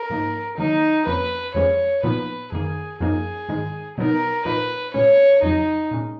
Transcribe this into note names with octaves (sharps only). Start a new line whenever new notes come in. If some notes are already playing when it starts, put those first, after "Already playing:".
Already playing: A#4
G#2 F3 A#3 D#4
D#3 F#3 A#3 D#4
F2 F3 A#3 C#4 B4
F2 F3 G#3 C#4 C#5
A#2 F3 B3 D#4 B4
F#2 D#3 A#3 G#4
F#2 F3 A#3 D#4 G#4
G#2 D#3 G#3
B2 F#3 B3 D#4 A#4
A#2 F3 A#3 D#4 B4
A#2 G#3 C#4 C#5
F2 C#3 F#3 D#4
A#2 G#3 C#4